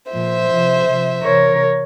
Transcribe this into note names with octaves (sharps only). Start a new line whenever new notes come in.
A#2 F3 C5 E5
C3 F3
C3 F3
C3 E3 A#4 C#5